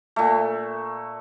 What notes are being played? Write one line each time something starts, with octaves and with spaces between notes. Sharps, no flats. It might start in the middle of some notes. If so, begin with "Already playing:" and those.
A#2 A3